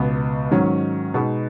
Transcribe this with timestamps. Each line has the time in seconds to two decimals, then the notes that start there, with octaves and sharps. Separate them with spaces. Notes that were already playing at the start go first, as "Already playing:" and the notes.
Already playing: C#2 B2 B3
0.51 G#2 D#3 F#3 C#4
1.14 B2 G#3 D#4 B4